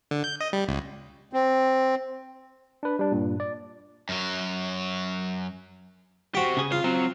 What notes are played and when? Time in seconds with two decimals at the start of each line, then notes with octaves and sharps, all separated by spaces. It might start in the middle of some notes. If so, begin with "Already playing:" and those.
0.11 D3
0.24 G6
0.40 D#5
0.53 G3
0.68 C#2
1.33 C4
2.83 D4 B4
2.99 G3 D4
3.12 G2 A#2
3.40 D5
4.09 F#2 F#3
6.35 F#4 G4 C5 G5
6.57 C#3 G#4
6.72 F4 F5
6.84 F#3 C4